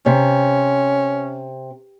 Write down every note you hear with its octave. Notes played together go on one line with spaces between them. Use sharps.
C3 C#4